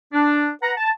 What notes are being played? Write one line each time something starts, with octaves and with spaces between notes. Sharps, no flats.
D4
B4 F#5 A#5
A5